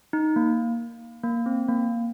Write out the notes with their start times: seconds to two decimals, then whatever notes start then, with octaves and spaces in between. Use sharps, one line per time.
0.13 D#4
0.36 A#3
1.23 A#3
1.46 C4
1.68 A#3